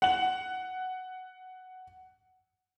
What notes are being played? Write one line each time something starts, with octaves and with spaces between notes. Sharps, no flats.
F#5 F#7